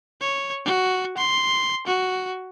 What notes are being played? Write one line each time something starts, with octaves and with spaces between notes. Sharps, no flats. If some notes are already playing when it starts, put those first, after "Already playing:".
C#5
F#4
C6
F#4